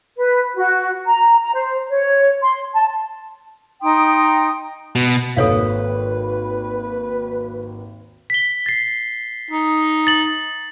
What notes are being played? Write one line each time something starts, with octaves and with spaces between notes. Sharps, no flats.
B4
F#4
A#5
A#5
C5
C#5
C6
A5
D#4 G5 C6 D#6
B2
G#1 D#2 A4 B4 C#5 F5
B6 G7
A6 C7
D#4
A6 F#7